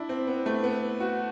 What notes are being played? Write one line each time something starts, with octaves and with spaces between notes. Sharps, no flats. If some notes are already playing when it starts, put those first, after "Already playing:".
Already playing: D4 E4
C4
B3
A3
B3
F#4